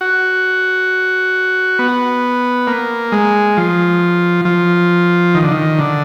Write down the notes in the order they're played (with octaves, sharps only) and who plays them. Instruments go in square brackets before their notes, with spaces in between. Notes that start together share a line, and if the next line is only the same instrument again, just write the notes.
[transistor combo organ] F#4
B3
A#3
G#3
F3
F3
D#3
D3
D#3
D3